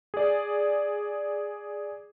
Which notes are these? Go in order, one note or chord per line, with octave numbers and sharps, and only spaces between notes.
G#4 D5